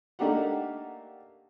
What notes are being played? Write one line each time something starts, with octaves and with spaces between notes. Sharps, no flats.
A3 A#3 D4 D#4 G4 F#5